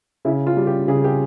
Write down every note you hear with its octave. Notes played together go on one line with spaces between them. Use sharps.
C#3 E4
F4
G3
G4
C#3 G#4
G4